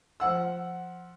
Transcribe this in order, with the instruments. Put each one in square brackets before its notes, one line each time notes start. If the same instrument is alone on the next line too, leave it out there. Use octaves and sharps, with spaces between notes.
[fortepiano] F3 F#5 E6